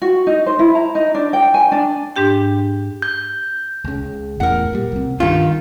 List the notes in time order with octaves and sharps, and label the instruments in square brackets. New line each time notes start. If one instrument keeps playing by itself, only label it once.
[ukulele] F#4
D#4
C5
E4
A#5
D#4
D4
G5
G#5
D4
[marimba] G#2 D4 G4 G5
[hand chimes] G6
[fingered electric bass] C#2 C#3
[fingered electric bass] E1 E2 A2 [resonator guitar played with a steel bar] A#4 F#5
[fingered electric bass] A#2 G3
C2 C3
[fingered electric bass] G2 [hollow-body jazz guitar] D#3 F4 [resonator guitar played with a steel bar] C#4